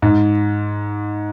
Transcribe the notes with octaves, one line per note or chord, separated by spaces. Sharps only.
G#2